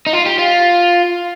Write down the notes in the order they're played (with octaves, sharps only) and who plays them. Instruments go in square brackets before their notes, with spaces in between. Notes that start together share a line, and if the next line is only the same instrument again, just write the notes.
[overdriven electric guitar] D#4
F4
G4
F4